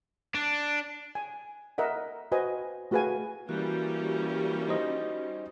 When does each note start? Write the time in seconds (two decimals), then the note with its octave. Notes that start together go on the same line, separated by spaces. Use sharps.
0.35 D4
1.15 G#5
1.78 A#4 D#5 E5 F#5
2.32 F#4 B4 C5 D#5 G#5
2.91 A3 F#4 G#4 B4 F5 G#5
3.49 E3 G3 A#3 C#4 F#4
4.68 D#4 C5 D#5